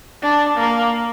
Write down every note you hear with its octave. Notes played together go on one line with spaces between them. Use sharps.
D4
A#3